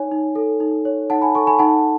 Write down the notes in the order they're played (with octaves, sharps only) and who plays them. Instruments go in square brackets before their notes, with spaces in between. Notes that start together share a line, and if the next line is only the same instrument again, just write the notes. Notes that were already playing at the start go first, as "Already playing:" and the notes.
Already playing: [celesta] D#4 C#5 G#5
D#4
A4
D#4
C#5
D#4 F#5 A5
G#5 B5
A4 A5 C#6
G#5 B5
D#4 F#5 A5